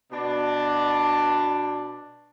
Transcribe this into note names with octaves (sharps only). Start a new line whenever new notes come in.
B2 D4